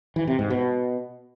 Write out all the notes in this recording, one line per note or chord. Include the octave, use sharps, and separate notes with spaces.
E3
C3
G#2
B2